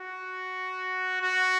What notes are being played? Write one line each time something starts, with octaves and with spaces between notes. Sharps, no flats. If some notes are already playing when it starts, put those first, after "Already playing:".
Already playing: F#4
F#4